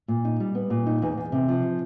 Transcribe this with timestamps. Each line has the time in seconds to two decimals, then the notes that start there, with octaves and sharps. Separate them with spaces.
0.08 A#2
0.25 D#4
0.40 G3
0.55 B3
0.70 A#2
0.86 D#4
1.02 E2
1.17 E2
1.32 C3
1.48 F3